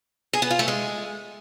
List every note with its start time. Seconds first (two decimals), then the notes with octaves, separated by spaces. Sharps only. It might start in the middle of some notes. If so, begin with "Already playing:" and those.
0.33 G#4
0.42 B3
0.51 F4
0.59 A3
0.68 G#3